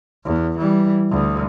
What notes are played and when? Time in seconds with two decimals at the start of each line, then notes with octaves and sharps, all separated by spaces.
0.24 E2
0.58 E3 G3
1.10 D2